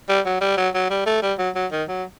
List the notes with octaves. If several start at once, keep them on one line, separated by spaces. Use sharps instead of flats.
G3
F#3
G3
F#3
F#3
G3
A3
G3
F#3
F#3
D#3
F#3